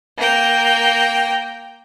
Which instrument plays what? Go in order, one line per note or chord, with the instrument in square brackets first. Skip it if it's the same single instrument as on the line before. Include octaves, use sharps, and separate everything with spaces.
[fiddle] A#3 G5